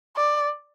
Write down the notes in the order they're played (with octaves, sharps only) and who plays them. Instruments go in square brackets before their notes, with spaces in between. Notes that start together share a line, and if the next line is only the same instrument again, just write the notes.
[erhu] D5